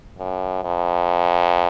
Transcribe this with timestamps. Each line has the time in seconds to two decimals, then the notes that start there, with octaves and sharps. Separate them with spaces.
0.19 F#2
0.64 F2